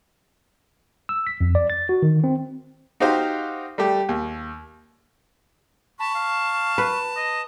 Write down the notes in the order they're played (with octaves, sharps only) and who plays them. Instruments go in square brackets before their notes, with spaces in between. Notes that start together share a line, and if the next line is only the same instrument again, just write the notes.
[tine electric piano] E6
B6
F2
D5
A6
F#4
D#3
C4
[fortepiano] D#4 F#4 G4 C5 F5
G3 A3 G4
D#2
[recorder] A5 [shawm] B5 [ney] C#6
[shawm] F5
[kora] B4
[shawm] D#5